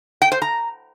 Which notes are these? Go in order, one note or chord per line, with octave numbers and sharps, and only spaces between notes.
G5
C5
A#5